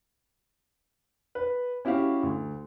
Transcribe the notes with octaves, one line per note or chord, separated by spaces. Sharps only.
B4
C#4 E4 F#4 G4 F5
D2